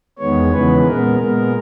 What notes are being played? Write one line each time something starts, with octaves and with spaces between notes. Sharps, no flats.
E2 D#3 G#3 B3 C#5
C#3 E3 G#3 B3 B4
A#2 G#3 B3 A#4
A#2 G#3 B3 A#4